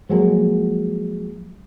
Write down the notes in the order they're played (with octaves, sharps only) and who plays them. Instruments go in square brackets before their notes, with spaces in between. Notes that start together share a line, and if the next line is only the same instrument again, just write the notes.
[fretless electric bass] F3 F#3 G#3 A#3